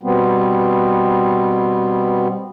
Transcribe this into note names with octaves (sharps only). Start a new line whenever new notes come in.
B2 G3 B3 C4